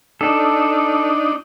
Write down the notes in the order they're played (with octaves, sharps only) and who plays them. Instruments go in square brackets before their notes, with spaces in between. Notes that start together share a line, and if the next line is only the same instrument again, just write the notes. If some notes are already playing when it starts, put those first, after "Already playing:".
[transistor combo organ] D4 D#4 [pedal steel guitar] A4